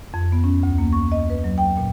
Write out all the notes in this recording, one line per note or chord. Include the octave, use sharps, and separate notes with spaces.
F2
B3
C#4
D2
A#3
C#6
D#5
B4
F#3
G5
A#2